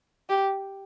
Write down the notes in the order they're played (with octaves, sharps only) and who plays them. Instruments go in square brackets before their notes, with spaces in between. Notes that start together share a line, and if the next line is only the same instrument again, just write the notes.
[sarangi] G4